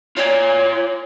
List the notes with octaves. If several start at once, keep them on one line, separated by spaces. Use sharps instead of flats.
F4 C#5 D5